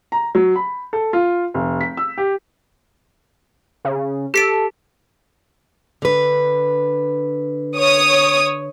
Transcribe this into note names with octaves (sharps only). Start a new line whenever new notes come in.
A#5
F#3
B5
A4
F4
F1
B6
E6
G4
C#3
G4 A4 B6 D7
D3 B4
C#5 D#6